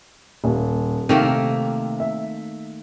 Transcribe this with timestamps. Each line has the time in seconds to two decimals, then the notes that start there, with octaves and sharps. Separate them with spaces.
0.44 D#1
1.09 C3 D#3 A3 A#3
2.00 E5